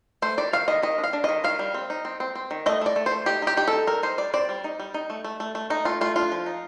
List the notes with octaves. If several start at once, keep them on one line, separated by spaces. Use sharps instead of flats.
A3 C5
D#3 D5
D#3 F5
D#3 D#5
D#3 D#5
D4
F5
D4
D#3 D#5
D#3 F5
G3
C4
D#4
C4
C4
C4
D#3
A3 D#5
A3 D5
A3
C5
A3
D#4 G4
D#4 G4
D#4 G4
A4
D#4
G3 A#4
D#4 C5
G3 D5
C4 D5
G3
D#4
G3
D#4
A3
A3
A3
A3
A3 D#4
A3 F4
A3 F4
D4 F4
F3
D#4